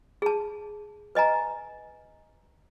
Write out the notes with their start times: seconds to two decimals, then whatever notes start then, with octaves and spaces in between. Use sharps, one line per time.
0.22 G#4 A5
1.15 B4 D#5 G#5 A#5